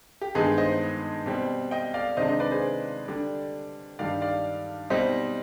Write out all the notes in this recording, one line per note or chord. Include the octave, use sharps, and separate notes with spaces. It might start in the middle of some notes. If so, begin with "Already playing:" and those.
G4
G2 D#3 G#3 B3 D#4 G#4
C5 D#5
B2 G3 C4
D#5 G5
D5 F5
C3 D#3 G#3 D4 C5 D#5
C5 D#5
B4 D5
G#4 C5
D3 G3 D4
G2 D#3 G3 D5 F5
D5 F5
B2 G3 C4 D#4 C5 D#5